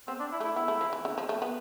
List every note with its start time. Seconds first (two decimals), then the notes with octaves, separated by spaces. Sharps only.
0.08 B3 C4
0.20 D4
0.32 E4
0.40 A3
0.45 E4
0.56 B3 E4
0.68 A3
0.81 F3
0.93 E3
1.05 D3
1.18 F3
1.29 A3
1.42 B3